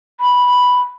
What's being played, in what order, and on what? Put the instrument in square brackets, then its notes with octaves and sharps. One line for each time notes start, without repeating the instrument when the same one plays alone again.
[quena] B5